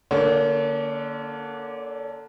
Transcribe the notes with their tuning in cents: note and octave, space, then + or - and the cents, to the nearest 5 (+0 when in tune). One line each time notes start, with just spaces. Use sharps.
D3 +0 A#3 +0 C#4 +35